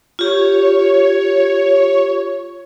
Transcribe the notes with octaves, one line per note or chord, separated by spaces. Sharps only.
F4 G4 C#5